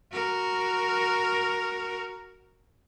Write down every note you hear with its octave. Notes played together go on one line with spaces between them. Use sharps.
F#4 A#4